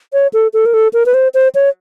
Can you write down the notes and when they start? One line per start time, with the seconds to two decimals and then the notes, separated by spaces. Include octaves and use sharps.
0.13 C#5
0.33 A4
0.54 A4
0.66 A#4
0.74 A4
0.93 A#4
1.06 B4
1.14 C5
1.34 C5
1.55 C#5